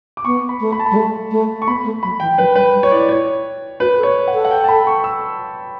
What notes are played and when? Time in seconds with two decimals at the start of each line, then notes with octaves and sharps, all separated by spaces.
0.17 D6
0.25 B3 C#6
0.49 B5
0.60 A3
0.72 B5
0.79 A5
0.86 G3 B5
0.96 A3
1.31 A3
1.62 C#6
1.67 B3 B5
1.85 A3
2.03 F#3 B5
2.20 E3 G5
2.38 F#3 B4
2.55 G3 B4
2.74 G3
2.83 C#5
2.91 E4 D5
3.09 C#5
3.80 F#4 B4
3.98 A4
4.03 C#5
4.28 F#5
4.34 A4
4.45 F#5
4.51 G5
4.64 A5
4.68 B5
4.87 C#6
5.04 E6